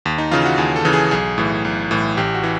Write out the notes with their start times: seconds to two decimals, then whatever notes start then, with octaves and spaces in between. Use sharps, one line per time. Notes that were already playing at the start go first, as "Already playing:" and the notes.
0.06 D#2
0.18 D#4
0.31 C#3 E3 F4
0.46 F#4
0.58 D#2 G#4
0.76 A4
0.85 C#3 E3
0.93 G#4
1.11 B1 G#4
1.38 A2 E3
1.65 B1
1.91 A2 E3
2.17 A1 G4
2.34 F#4
2.43 E3